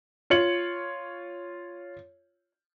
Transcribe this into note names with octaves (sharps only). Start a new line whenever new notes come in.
F4 C#5 C#7 F#7